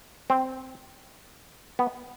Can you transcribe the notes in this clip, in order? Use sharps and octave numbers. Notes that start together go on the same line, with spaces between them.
C4
B3